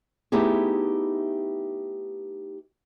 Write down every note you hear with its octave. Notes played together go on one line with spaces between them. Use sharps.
A3 B3 D#4 E4 G4 G#4